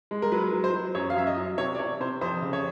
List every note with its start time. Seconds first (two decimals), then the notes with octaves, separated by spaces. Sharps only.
0.11 G#3
0.22 A#4
0.32 F#3 B4
0.53 F#3
0.64 C5
0.73 F#3
0.95 F#2 C#5
1.10 F5
1.16 F#2 E5
1.27 D#5
1.37 F#3
1.58 C3 C#5
1.75 D5
1.79 C3 C#5
2.00 C3 C5
2.21 F2 C5
2.42 C#3
2.53 C#5